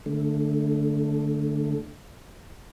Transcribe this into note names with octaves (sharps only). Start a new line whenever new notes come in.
D3 A3